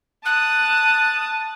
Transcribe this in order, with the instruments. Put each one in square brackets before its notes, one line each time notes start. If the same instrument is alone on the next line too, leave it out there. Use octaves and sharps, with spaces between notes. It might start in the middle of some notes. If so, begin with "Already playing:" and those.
[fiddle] A5 D#6 [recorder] F#6